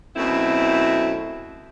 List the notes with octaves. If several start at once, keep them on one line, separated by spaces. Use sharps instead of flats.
F#2 B2 A3 C4 E4